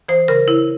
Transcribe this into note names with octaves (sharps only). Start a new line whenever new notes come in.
E3 C5
C#3 A#4
C#3 E4